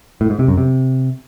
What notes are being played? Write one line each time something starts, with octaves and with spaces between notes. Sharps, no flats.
A2
G#2
C3
F#2
C3